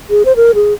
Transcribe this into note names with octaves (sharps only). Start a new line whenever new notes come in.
G#4
C5
A#4
G#4